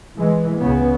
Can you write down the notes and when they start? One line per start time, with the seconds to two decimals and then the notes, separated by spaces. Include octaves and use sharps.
0.18 E3 G#3
0.61 C#2 C#3 B3